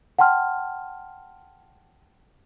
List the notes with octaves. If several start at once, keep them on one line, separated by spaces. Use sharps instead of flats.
F#5 G5 A5 C6 F6